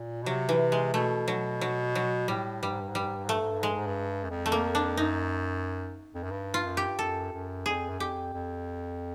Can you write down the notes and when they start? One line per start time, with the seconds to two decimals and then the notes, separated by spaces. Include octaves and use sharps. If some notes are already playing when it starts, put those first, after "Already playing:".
Already playing: A#2
0.23 B2
0.26 C3 F#3
0.49 E3
0.72 G#3
0.93 B2 A3
1.28 F#3
1.61 F#3
1.95 F#3
2.28 A2 G3
2.62 G2 G3
2.71 G#2
2.80 G2
2.89 G#2
2.95 G2 G3
3.07 G#2
3.16 G2
3.25 G#2
3.29 G2 A3
3.42 G#2
3.51 G2
3.60 G#2 G#3
3.69 G2
3.78 G#2
3.86 G2
4.24 F#2
4.30 F2
4.46 A3
4.52 A#3
4.75 D4
4.97 F#2 D#4
6.15 F2
6.23 F#2
6.31 G2
6.54 F4
6.66 F#2
6.77 G4
6.88 G2
6.99 F#2 A4
7.32 F#2
7.66 F2 G#4
7.90 F#2
8.00 F2 G4
8.33 F2